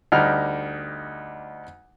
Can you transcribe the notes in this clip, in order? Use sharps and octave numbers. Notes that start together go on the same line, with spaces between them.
D2 G3 D#4 F6